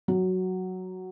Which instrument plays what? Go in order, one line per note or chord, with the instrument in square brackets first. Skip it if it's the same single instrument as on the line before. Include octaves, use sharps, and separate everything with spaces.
[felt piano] F#3